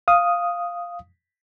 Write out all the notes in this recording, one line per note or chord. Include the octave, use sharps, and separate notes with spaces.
F5 D#6